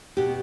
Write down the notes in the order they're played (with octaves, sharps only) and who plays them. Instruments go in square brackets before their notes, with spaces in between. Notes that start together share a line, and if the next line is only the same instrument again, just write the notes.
[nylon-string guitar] B2 B3 G4